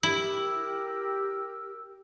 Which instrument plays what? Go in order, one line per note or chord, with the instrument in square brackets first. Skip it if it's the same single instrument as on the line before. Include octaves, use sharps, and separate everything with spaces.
[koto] E4 [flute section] G4 A#4 E6